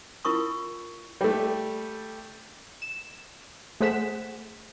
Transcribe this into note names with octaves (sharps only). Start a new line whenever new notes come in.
E4 F4 A#4 C#6 D#6
G3 A3
E7
A3 G#4 C5 F#5 B6 E7